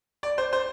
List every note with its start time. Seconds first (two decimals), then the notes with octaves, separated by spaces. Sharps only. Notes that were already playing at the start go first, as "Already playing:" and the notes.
0.23 D5
0.38 C5
0.53 C5